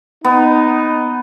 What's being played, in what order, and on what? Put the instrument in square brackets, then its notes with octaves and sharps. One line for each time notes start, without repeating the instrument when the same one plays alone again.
[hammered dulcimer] B3 [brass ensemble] D#4